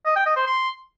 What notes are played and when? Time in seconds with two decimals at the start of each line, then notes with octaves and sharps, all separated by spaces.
0.05 D#5
0.16 G5
0.26 D#5
0.36 C5
0.47 C6